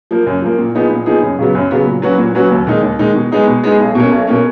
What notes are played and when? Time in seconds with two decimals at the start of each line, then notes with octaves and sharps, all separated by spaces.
0.11 F3 A#3
0.26 F#2
0.42 F3 A#3
0.58 A#2
0.75 F3 B3 D#4 G#4
0.91 A#2
1.06 F3 B3 D#4 G#4
1.23 F#2
1.39 C#3 F#3 B3
1.55 F#2
1.71 C#3 F#3 B3
1.86 A#2
2.02 F#3 C#4 F#4 B4
2.18 A#2
2.35 F#3 C#4 F#4 B4
2.51 D#2
2.67 D#3 G#3 D#4
2.82 D#2
2.99 D#3 G#3 D#4
3.15 B2
3.31 G#3 B3 D#4 G#4
3.47 B2
3.64 G#3 B3 D#4 G#4
3.80 B1
3.95 B2 A#3 C#4
4.11 B1
4.27 B2 A#3 C#4